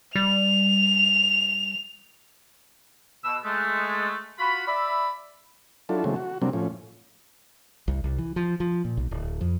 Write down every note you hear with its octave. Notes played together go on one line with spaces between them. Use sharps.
G3 F7
B2 E6
G#3 A3
F4 F#4 B5
D5 E5 B5
F#3 D4 E4 F4 A4
C#3 E3 F#3 G#3 A3 C4
F#4
C3 F#3 G3 A#3 C4 D4
A2 F3 C#4
C2
C2
E3
F3
F3
A#2
B1
D1
F2